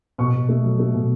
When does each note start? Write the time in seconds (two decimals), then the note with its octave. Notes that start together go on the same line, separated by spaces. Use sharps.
0.18 B2 C#6
0.34 B2
0.49 A3
0.63 F#3
0.79 A3
0.94 B2